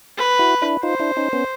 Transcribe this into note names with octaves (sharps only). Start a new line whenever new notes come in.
B4
E4 F#4
D4 E4
D#4 F4 C5
D4 E4
C#4 D#4
B3 C#4